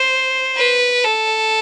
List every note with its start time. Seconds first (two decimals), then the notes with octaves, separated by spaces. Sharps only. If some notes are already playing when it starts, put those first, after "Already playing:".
Already playing: C5
0.57 B4
1.04 A4